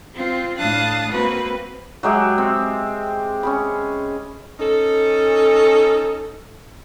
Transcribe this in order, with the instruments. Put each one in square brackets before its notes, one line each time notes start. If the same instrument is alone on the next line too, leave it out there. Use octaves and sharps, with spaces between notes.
[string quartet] C4 F4
A2 D4 F5 A5 D#6 F#6
A#3 C4 F#4 B4
[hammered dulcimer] F#3 G#3 G4 E5
C4
C#4 G#4 B5
[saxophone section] C#4 D#4 A4